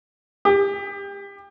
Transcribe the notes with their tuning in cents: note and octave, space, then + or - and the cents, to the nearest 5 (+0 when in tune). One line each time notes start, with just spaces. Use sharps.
G4 +30